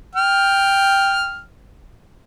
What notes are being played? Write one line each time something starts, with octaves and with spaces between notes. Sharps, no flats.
G5 F6